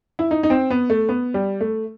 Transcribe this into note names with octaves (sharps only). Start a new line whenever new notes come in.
E4
D#4
D#4
C4
B3
A3
B3
G3
A3